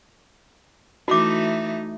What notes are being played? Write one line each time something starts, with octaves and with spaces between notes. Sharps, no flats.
E3 A3 D#4 F#4 D6